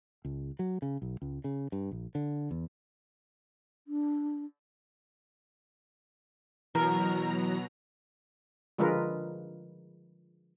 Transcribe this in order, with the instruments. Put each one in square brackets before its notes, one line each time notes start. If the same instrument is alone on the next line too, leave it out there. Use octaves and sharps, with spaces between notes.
[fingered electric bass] C#2
F#3
C#3
B1
C#2
C#3
G2
A#1
D3
E2
[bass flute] D4
[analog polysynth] B2 [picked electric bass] E3 [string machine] F#3 A#5 [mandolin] A#4
[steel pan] D3 F3 G#3 F4 A#4 B4